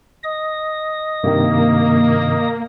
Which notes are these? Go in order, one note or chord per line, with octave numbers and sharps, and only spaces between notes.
D#5 D#6
G2 C3 D#3 A#3